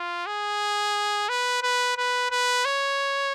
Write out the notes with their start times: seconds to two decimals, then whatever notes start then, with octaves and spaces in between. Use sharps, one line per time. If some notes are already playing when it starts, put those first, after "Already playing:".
Already playing: F4
0.26 G#4
1.29 B4
1.63 B4
1.97 B4
2.31 B4
2.65 C#5